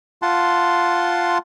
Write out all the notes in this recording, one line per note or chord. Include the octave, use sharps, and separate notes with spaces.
F4 F#5 A5 C6